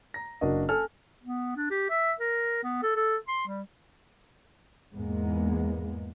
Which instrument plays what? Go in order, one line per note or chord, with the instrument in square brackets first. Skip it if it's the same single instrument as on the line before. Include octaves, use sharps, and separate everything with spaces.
[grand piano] A#5 A#6
F#1 D4 F#4 A#4 D#5
A4 G#5 F6
[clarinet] B3
D4
G4
E5
A#4
B3
A4
A4
C6
G3
[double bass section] E2 G#2 G#3 A#3 B3